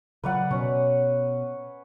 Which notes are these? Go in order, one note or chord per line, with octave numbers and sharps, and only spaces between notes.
C#3 F#3 B4 D5 F#5
B2 C#4